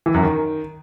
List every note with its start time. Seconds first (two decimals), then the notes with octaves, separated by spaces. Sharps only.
0.06 E3
0.14 F#2
0.23 D#3